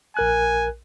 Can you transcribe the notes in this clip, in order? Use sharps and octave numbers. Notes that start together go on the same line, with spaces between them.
A#1 A#4 G#5 F#6